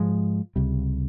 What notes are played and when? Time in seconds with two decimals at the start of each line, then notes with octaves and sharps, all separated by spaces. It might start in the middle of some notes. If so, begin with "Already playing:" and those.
Already playing: G#2 F3 G#3
0.56 C#2 C3 G3